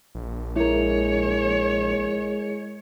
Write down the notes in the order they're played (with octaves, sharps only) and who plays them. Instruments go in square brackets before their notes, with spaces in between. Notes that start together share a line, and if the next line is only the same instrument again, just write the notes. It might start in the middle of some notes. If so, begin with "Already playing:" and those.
[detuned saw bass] A#1
[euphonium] G#3 [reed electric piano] E4 A#4 [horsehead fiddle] C#5